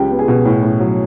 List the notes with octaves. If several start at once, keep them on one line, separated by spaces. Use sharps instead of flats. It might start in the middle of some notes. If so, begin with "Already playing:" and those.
Already playing: C#2 G4 G5
B3
G#4 G#5
B2
A2
A2
F#3